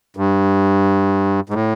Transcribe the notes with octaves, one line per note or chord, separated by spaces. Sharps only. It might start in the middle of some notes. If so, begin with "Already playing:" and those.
G2
G#2
A2